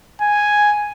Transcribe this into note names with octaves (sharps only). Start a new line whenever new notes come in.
G#5